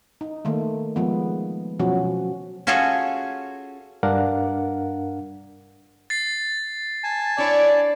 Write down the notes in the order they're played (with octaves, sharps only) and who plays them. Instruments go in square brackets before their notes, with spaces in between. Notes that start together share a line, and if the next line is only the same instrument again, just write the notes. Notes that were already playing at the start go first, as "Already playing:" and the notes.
[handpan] D#4
D#3 A3 A#3
F3 G#3 B3
B2 F3 F#3 C#4 F#4
[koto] C#4 F4 F#4 G#4 A4 C#5
[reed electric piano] G2 D4 A#4 F5 F#5
[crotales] A6 C7
[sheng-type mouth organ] G#5 A5
[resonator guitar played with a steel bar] D4 [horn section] E4 C#5 D5